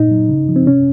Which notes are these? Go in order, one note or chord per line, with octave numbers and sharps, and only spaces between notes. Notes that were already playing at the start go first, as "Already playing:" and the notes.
Already playing: A#2 D#4
F#3
C#3
F3
C4
C3 C#4